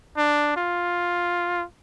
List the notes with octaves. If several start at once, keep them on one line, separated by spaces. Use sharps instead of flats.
D4
F4